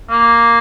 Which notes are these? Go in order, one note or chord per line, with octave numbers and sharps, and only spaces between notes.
A#3